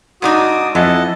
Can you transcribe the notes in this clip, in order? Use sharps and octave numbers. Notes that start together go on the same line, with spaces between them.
G#2 D4 D#4 F#4 D#6
F2 E3 D#5 F#5 A5